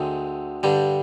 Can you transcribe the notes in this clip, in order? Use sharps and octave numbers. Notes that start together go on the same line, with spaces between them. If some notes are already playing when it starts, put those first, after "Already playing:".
Already playing: D2 D3 G#3 C4
G2 D3 G3